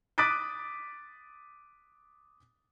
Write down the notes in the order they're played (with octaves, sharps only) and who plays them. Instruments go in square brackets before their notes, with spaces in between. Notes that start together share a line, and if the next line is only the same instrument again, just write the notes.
[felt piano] D6 D#6 F#6 A6 B6 D7